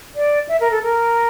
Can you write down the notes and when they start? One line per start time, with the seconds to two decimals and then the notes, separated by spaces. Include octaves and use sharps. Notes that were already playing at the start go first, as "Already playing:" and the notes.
0.16 D5
0.49 E5
0.60 A#4
0.71 A4
0.83 A#4